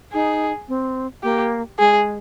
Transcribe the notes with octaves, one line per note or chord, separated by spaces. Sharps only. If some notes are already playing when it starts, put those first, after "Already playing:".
D#4 G#4
C4
A#3 G4
G#3 G#4